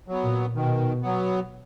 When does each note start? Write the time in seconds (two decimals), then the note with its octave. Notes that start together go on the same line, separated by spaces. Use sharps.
0.08 F#3 B3
0.24 A#2
0.55 B2 D#3
1.02 F#3 B3